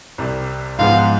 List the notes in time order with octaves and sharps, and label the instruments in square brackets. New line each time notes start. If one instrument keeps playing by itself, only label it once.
[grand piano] C2 C3 G3
[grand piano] G#2 F3 G#3 B3 [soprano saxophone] F5